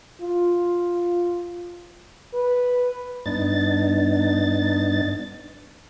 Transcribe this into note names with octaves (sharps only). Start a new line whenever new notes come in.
F4
B4
G2 B3 D4 D#4 A6